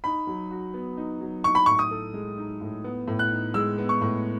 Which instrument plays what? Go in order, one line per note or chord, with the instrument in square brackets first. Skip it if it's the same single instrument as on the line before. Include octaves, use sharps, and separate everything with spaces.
[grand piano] D#4 [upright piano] B5
[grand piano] F#3
F#4
B3
D#4
F#3
[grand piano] D#4 [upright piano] C#6
[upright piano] B5
[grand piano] A2 [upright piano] C#6
[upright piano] D#6
[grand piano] A4
G#3
D#4
A2
B3
A2
[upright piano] F#6
[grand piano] D#4
[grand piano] G#3 [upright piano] E6
[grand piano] B3
[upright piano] C#6
[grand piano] A2